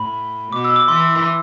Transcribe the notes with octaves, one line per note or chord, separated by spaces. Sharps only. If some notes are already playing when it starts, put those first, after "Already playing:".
Already playing: A2 B5
B2 D6
E6
D6
E3 C6